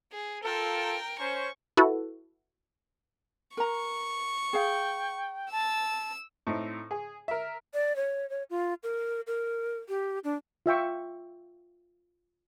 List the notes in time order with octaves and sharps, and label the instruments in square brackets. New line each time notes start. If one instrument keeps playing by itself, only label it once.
[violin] G#4
[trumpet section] F4 A4 [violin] A#4 G5
[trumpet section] C#4 C5 [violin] C#6
[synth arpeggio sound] E4 F#4 A4 B4
[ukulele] A#4 A#5 [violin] C#6
[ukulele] G#4 F5 [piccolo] G5
[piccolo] A5 [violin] E6
[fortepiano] A2 A3 C4 D#4
G#4
A#4 E5
[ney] D5
C#5
C#5
F4
A#4
A#4
G4
D4
[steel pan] F4 E5 G5 C#6